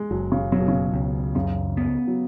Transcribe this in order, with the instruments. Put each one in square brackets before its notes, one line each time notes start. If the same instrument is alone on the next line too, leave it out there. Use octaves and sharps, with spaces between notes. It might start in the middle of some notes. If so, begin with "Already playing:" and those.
Already playing: [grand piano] G#3
[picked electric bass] F#1 [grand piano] F#3
[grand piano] C#3
[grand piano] C#3 [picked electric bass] F#3
[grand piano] B2
C#3
[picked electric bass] C#2
[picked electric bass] F#2 [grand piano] C#3
[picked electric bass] B3
[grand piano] F#3